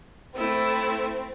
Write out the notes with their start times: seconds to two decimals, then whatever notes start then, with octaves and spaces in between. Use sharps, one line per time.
0.37 A3 C4 E4